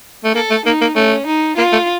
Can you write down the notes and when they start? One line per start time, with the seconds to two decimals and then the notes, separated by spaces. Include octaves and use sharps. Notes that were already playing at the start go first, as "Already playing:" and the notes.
0.24 A3
0.35 A#3 A4
0.50 A3
0.66 A#3 D#4
0.81 A#3
0.95 A3 C#4
1.26 D#4
1.57 A#3 F4
1.72 A3